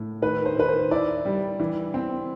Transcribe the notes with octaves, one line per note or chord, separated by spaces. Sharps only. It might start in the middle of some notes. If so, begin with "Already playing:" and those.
Already playing: A2
D#3 B4
C5
D#3 B4
C5
E4 D5
G3
E3
C4